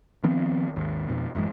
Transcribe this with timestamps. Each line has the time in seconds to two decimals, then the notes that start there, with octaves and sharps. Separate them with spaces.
0.23 D#3 F3 B3 C4
0.76 G#1 D#2
1.09 F2 B2
1.35 A1 F#2 E3 G#3